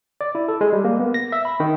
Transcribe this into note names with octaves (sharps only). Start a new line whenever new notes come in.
D5
E4
A4
G#3
G3
A#3
B3
A#6
E5
B5
D#3